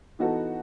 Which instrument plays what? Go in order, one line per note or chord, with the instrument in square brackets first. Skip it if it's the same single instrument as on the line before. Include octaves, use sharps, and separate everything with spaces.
[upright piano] E3 B3 D#4 F#4 A4